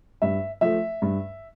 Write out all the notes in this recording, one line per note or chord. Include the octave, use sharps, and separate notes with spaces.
G2 E5
F3 A3 E5
G2